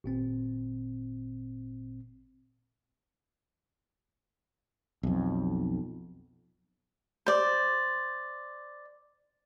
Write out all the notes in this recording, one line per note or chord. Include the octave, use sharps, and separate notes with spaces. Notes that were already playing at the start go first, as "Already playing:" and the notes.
G#1 A#2 C4
B1 F2
C5 D5